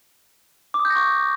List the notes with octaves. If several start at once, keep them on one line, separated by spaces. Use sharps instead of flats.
D6
D#6
G6
A#6
C#6